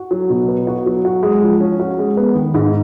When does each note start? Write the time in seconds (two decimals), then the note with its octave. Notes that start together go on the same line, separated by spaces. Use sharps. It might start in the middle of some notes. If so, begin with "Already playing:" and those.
Already playing: F#4
0.11 F#3
0.30 B2
0.48 B3
0.67 F#4
0.86 F#3
1.05 F#4
1.23 G#3
1.42 F3
1.60 C#4
1.80 F#4
1.99 G#3
2.17 B3
2.35 D#3
2.54 G#2